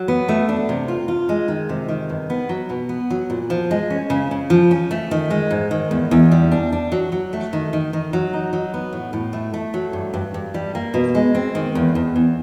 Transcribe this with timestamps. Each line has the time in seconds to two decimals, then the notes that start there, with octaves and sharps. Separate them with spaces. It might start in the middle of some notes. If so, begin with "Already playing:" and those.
Already playing: F#3
0.08 B3
0.29 A3
0.49 D4
0.69 C3
0.88 F4
1.08 F4
1.29 G#3
1.48 D#3
1.69 C3
1.89 D#3
2.10 G2
2.30 B3
2.49 F#3
2.70 B2
2.89 B3
3.10 F#3
3.30 A#2
3.50 F3
3.71 G#3
3.90 C#4
4.10 C#3
4.31 C#3
4.50 F3
4.71 C#4
4.91 A3
5.11 D#3
5.30 G#3
5.51 G#2
5.71 D#3
5.91 E2
6.11 E2
6.31 G3
6.52 D4
6.72 D4
6.92 F#3
7.12 F#3
7.33 A3
7.53 D#3
7.73 D#3
7.93 D#3
8.13 F#3
8.33 D#4
8.53 F#3
8.74 B3
8.93 A2
9.13 A2
9.33 A3
9.54 A3
9.74 F#3
9.93 G2
10.14 G2
10.34 G2
10.54 G3
10.75 A#3
10.94 B2
11.15 G#3
11.35 C4
11.55 D#3
11.75 E2
11.95 E2
12.16 E2